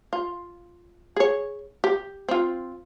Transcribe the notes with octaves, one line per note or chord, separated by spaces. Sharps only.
F4
G#4 C#5
G4
C4 F4